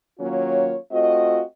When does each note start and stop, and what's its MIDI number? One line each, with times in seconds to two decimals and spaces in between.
0.20 0.75 51
0.20 0.75 54
0.20 0.75 58
0.20 0.75 61
0.20 0.75 65
0.20 0.75 73
0.92 1.42 57
0.92 1.42 60
0.92 1.42 65
0.92 1.42 66
0.92 1.42 75